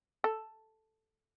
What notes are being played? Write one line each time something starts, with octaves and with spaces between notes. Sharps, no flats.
A4